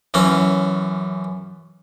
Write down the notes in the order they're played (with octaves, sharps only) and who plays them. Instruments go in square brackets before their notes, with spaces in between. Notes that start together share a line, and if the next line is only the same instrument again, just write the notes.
[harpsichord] F#2 E3 C#4